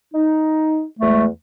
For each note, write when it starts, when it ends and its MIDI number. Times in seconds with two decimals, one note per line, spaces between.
0.12 0.82 63
0.99 1.26 40
0.99 1.26 56
0.99 1.26 57